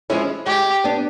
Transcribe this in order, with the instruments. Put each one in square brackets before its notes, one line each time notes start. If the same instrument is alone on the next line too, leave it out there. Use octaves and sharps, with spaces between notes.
[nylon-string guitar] F3 G#3 C#4 E4
[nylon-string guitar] G#3 [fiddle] G4
[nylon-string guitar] B3 D4